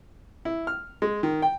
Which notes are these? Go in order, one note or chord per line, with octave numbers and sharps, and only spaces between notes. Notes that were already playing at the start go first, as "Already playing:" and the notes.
E4
F6
G#3
D#3
G5